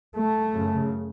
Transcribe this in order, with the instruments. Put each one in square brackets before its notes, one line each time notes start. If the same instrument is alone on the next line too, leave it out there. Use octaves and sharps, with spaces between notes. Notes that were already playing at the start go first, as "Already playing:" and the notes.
[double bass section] A3
F#2 C#3